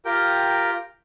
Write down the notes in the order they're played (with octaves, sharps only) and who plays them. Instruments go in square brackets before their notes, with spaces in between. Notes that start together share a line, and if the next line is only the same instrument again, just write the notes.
[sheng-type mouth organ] F4 G4 A#4 G5